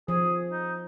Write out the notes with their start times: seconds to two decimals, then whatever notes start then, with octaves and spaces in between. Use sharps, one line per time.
0.08 F3 G#4
0.52 D#4